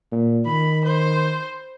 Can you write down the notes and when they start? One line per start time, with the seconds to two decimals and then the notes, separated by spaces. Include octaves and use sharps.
0.11 A#2
0.46 D#3 B5
0.85 C5